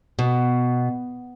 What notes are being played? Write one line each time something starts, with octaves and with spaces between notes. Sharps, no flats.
B2